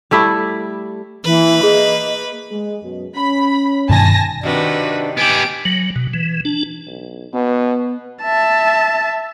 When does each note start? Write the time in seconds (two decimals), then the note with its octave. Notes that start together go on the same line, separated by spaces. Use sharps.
0.11 G3 A3 E4 D5
1.24 E3 A#3 B4
1.63 G#4 D#5
2.51 G#3
2.82 F#2 B2
3.16 C#4 B5
3.90 G2 B2 D#3 G#5 A5 A#6
4.43 C3 D#3 D4 F#4 B4
5.17 B3 G4 G#5 D7
5.65 F#3
5.96 B2
6.13 E3
6.45 D4
6.87 B1
7.33 B2 B3
8.23 E5 A5